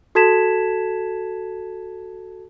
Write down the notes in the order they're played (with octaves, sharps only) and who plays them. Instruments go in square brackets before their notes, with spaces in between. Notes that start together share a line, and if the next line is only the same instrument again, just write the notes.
[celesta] F#4 A4 A5 G#6 B6 E7